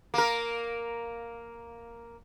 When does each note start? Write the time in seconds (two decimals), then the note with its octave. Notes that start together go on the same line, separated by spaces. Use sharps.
0.14 A#3 A#4